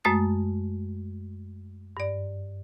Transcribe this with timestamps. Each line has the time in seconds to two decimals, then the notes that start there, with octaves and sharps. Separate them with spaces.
0.04 F#2 G#3 A3 D#6 A6
1.97 G2 D5